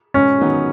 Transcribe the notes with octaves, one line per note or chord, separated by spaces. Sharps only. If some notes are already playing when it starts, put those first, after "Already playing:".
G#2 C#4
D#3 F#3 B3 D#4